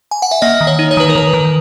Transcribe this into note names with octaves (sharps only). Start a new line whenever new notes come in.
G#5
F#5
E5
A#3 D#5
D#3
C#5
D#4
C#5
D#3 B4
A#4
D#3 B4
D#3